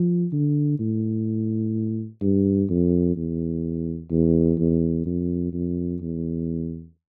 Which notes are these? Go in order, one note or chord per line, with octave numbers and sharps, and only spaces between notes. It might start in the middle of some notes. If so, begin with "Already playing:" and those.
Already playing: F3
D3
A2
G2
F2
E2
E2
E2
F2
F2
E2